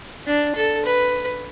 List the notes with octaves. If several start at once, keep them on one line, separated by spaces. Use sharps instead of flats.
D4
A4
B4